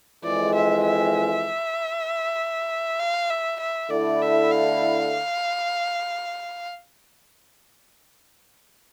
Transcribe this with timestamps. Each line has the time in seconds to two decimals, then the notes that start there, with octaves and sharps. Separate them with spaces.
0.24 F2 E3 G#3 D5
0.54 E5
0.86 E5
2.99 F5
3.30 E5
3.60 E5
3.90 D3 A3 E4 D5
4.22 E5
4.51 F5